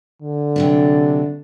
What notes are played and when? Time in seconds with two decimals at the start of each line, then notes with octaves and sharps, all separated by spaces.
0.22 D3
0.56 C3 F#3 D4